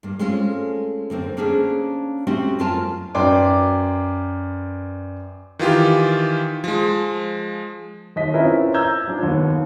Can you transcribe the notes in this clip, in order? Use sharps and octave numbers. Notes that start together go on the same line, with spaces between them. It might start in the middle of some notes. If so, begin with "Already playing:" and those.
G2 A#3
G#3 A3 C4 C#4 F4 G#4
F#2 D3 A#3 C4
A#3 C#4 D4 G#4 C5
A3 C4 C#4 F#4 G4
F#2 C4 F4 A#4 G#5 A5
F#2 B4 D5 G5 C6 D6
D#3 E3 F4 G4
F3 G#3
D#2 D#5 B6
C4 C#4 E4 F4 A#4 B4
A#5 E6 G6 G#6
F3 D4
D#2 B3